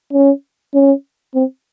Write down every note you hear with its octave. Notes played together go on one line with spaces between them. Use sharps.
C#4
C#4
C4